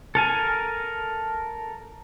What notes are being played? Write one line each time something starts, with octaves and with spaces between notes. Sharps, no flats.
A4 A#4 G#5